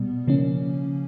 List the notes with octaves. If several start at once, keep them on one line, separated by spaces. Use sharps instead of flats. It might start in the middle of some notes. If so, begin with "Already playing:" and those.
Already playing: B2 G3 B3
C#3 F3 A#3 C#4